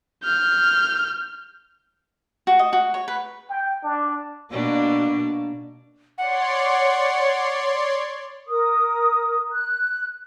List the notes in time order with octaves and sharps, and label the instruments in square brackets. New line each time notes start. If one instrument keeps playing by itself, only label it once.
[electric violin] F6 G6
[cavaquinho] F#4
D#5
F#4
C#5
B4
[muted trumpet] G5
D4
[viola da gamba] B2 A#3 D4
[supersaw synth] C#5 D5 C6 [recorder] F#5
[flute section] A#4 D#6
F#6